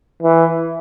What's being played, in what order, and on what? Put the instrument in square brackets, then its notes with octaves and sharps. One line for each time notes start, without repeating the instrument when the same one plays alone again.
[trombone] E3